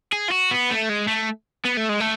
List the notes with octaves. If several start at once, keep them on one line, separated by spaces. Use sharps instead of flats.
G#4
F4
F#4
B3
A3
G#3
A3
B3
A3
G#3
A3